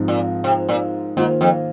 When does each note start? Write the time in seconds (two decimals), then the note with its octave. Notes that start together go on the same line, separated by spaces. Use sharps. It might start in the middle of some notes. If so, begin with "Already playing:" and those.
Already playing: G#2 F3 C4 D#4
0.08 A#2
0.44 C3
0.69 A#2
1.17 G#2 D#3 A#3 F4
1.41 F2